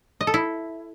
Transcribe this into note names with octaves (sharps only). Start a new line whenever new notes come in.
D#5
A4
E4